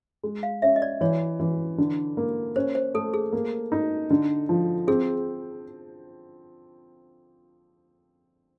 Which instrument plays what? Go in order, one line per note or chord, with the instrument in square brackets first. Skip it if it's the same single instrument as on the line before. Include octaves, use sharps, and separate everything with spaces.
[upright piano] G#3
[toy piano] F5
[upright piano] C#4 [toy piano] E5
[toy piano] D#5
D5
[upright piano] E3 [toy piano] C#5
[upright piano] E3
D3
A#3
[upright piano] C#4 [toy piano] C5
[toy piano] C5
[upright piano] A3 [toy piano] A4
[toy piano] G#4
[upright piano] A#3
D#4
D3
F3
[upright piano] C4 [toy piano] G#4